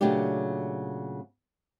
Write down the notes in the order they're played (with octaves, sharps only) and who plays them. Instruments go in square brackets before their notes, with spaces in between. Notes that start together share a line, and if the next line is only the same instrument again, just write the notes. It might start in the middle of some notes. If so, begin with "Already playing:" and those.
[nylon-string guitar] A#2 C#3 F#3 A3 D4 G4